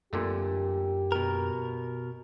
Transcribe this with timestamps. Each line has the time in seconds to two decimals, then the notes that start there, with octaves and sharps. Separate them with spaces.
0.13 F#2 A#2 D3 A3 C4 G4
1.12 B2 A#4